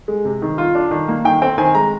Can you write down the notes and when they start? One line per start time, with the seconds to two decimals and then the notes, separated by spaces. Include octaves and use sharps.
0.08 G#3
0.25 C3
0.42 D#3
0.58 F4
0.75 D4
0.91 D#3
1.08 A#3
1.25 D#3 G5
1.42 C4 G5
1.58 D#3 G#5
1.75 G#3 A#5